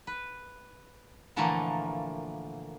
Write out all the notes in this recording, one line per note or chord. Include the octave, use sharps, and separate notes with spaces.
B4
A#2 D3 E3 F3 A3 A#3